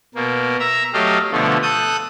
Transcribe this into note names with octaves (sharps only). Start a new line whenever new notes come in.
B2 A#3
E5 A#5 E6
F#3 A3 G4 D#5 F5
B2 D3 F3 A3
A4 D#6 F#6 G6